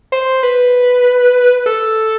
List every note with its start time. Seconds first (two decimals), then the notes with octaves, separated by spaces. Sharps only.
0.12 C5
0.43 B4
1.66 A4